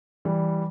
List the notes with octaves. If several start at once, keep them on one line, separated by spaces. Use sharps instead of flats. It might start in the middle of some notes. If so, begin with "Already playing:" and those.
E3 G3